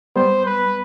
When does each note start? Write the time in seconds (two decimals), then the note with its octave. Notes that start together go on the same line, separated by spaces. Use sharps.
0.16 G3 B3 C5
0.45 B4